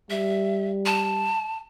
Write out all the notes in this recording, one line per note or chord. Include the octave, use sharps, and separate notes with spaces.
G3 E5
A5